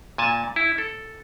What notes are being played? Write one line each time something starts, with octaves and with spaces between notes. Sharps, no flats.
A#2 G#5 A5
E4
A4